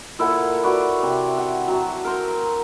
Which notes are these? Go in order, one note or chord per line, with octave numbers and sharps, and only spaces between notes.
A#2 E4 A4 F#5
F#4 B4 C#5 D5
C3
F#5
F#3 A5
A#4 C5